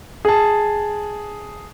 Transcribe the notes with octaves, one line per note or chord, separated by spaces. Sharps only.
G#4 A5